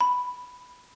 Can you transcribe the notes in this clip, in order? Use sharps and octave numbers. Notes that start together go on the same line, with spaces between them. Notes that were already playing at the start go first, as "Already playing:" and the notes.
B5